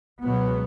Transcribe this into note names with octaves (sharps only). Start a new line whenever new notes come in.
C#2 B2 F#3 B3